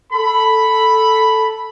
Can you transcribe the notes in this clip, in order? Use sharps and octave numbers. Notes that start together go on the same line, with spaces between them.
A4 B5